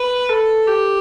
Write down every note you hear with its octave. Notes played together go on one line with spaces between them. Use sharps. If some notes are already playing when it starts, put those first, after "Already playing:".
Already playing: B4
A4
G4